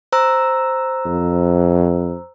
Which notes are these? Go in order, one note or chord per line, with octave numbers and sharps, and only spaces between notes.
C5 A#5 E6
F2